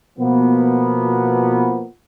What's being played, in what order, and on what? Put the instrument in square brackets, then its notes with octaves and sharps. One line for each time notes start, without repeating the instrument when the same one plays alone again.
[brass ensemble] B2 F3 A#3 B3